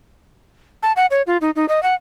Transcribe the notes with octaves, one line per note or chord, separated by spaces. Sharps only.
A5
F#5
C#5
F4
D#4
D#4
D#5
F#5